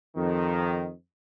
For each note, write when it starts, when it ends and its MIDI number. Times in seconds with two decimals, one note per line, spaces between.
0.16 0.90 41
0.16 0.90 51